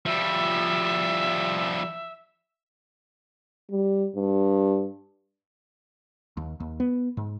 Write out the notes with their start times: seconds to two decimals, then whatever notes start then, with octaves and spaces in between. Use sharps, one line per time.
0.05 F3 G3 E5
3.71 G3
4.15 G2
6.37 D#2
6.60 D#2
6.80 B3
7.17 G#2